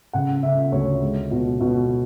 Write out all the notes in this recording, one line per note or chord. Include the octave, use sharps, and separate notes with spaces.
C#3 F#5
C#3 E5
D2 C#5
G#3
B2
B2